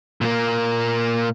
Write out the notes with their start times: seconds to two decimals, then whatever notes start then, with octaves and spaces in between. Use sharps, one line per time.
0.21 A#2 A#3